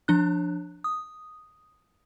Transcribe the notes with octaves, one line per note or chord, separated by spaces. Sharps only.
F3 D4 F#6
D#6